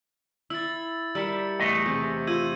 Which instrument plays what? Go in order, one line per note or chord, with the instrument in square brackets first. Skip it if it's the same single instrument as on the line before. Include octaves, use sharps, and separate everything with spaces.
[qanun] E4 [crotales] E6 A6
[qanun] G3 A#4 E5 [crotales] E6 C#7
[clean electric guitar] E2 A3 D#5
[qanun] C3 G#4
[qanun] F4 [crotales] E6 G#6 D#7